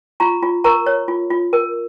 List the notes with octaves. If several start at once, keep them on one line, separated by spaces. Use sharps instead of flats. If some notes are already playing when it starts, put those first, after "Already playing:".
F4 A#5 C#6
F4
A#4 A#5 C#6
C#5
F4
F4
A#4